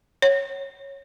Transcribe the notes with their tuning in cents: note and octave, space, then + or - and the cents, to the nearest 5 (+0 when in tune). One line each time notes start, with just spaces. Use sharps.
C#5 -10